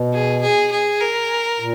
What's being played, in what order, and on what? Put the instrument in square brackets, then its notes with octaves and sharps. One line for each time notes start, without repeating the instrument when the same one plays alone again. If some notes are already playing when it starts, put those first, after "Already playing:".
Already playing: [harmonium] B2
[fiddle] G#4
G#4
G#4
A#4
[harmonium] A#2